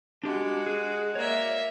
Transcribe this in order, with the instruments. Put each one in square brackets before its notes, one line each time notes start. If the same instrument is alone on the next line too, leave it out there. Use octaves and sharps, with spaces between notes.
[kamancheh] G#3 F#4 [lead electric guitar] D4 G4
[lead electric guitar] G#4
[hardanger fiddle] A#3 E5 [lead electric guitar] C#5 D5